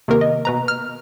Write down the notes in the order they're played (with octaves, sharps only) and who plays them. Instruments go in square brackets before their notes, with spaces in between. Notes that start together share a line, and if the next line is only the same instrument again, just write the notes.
[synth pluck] C3 D#3 A#3 A#4
D#5
B2 B4 A#5
F6